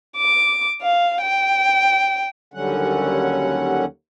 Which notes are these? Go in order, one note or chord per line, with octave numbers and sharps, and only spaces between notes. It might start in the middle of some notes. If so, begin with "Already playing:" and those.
D6
F5
G5
D#2 D3 F#3 G3 C#4 F#5